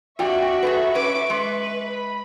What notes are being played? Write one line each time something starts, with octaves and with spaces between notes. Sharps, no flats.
F2 D4 F#4 E5 G5 C#6
G#4 A4 B4
C#4 B4 D6
G#3 B4
B5